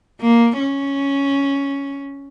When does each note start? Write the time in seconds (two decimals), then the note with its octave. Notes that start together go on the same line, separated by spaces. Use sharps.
0.21 A#3
0.60 C#4